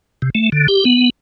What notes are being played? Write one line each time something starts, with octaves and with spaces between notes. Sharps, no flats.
C3
A3
D3
G4
B3